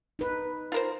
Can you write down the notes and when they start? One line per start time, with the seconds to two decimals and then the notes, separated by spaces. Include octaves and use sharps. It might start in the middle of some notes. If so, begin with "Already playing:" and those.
0.19 D#4 B4
0.72 F4 A#4 C5